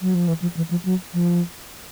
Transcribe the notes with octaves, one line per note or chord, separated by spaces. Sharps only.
F#3
F3
E3
F3
E3
F3
F#3
F3